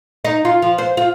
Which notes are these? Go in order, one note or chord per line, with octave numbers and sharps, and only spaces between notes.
D#4
F4
F3
C5
F4